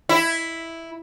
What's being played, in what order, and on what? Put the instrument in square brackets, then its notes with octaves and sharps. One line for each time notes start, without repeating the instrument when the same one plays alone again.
[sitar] E4